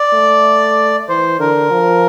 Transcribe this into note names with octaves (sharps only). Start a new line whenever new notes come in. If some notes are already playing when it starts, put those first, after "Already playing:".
Already playing: D5
A3
E3 C5
D3 A#4
F3